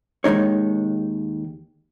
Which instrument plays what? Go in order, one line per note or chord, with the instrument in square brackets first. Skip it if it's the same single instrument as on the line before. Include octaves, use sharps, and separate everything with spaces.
[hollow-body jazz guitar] D#2 D#3 G#3 D#4 C#5